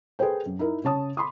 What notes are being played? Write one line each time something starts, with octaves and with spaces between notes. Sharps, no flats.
G#4 A4 B4 C5 G5
F#2
D#4 E4 A#4
C#3 C#5 A5 D#6
B5 C6 D6 D#6